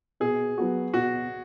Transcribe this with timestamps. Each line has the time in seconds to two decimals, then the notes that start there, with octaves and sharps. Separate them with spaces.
0.20 B2 G#4
0.58 F#3 B3 F#4
0.94 B2 F#4